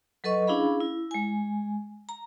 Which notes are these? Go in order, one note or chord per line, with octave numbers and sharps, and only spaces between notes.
F#3 A4 B4 D#5 C#6
C#4 D4 E4 G#4 F5 B5
E4
G#3 G#5
A#5